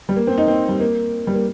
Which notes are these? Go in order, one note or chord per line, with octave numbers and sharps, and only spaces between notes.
G3
A#3
C4
D#4
C4
G3
A#3
G3
A#3